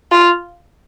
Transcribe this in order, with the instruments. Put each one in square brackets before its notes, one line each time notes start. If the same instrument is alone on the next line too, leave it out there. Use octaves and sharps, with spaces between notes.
[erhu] F4